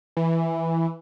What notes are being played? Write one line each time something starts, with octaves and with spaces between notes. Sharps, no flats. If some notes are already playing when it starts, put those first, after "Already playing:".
E3